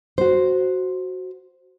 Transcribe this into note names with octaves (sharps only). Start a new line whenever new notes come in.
F#4 C5